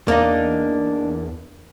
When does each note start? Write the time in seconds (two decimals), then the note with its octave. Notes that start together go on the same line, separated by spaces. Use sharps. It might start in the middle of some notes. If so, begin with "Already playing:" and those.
0.08 E2 A#3 D4 D#4 D5 D#5